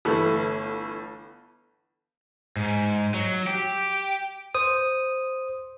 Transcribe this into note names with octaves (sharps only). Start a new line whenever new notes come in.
G1 E3 A3 B4
G#2
F#3
G4
C5 D#6